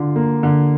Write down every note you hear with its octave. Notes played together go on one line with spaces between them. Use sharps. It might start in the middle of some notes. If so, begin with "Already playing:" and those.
Already playing: D3 F4
A#3
D3